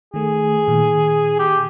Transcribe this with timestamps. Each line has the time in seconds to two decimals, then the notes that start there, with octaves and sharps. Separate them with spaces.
0.14 D#3 A3 G#4
0.68 A#2 D#3
1.40 G4